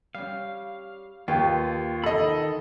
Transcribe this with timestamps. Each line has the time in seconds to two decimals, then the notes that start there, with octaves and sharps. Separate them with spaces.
0.15 G3 C#4 F5
1.28 D#2 F4 G4 B4 G5
2.04 D#3 A4 D#5 B5